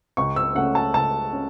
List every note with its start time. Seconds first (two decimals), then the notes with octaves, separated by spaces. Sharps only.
0.17 C#2 C#6
0.36 E6
0.55 C#3 A3 C#4 F#5
0.75 A5
0.94 C#2 A5
1.32 C#4